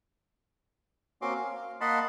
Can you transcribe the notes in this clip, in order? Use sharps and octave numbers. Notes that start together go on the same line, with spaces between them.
A#3 C4 C#4 F#4 C6 D6
F5
A#3 D#5 F#5 A5 B5 C6